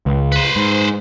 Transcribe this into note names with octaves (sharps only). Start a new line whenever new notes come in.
C#2
B4 C5
G#2